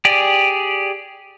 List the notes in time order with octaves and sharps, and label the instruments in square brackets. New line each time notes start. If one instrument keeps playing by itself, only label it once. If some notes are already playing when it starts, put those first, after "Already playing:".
[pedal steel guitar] G4 G#4 D5